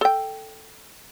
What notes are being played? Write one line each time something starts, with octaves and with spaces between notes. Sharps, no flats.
A4 G5